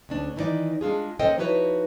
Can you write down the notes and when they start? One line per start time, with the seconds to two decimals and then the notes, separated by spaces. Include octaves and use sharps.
0.09 D2 C#4 D4
0.36 D#3 E3 C4 D#4 D5
0.81 G#3 D4 F4 G#4
1.19 D#2 C#4 A4 C5 D#5 G5
1.38 F3 D#4 E4 F#4 B4 C#5